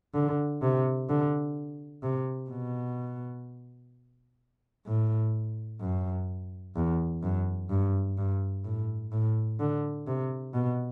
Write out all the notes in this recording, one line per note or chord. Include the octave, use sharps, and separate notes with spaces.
D3
C3
D3
C3
B2
A2
F#2
E2
F#2
G2
G2
A2
A2
D3
C3
B2